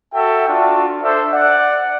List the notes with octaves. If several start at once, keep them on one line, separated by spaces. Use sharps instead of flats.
F#4 A4 E5 G5
D4 F4 F#4 A5
D4 A4 C5 E5
D5 F#5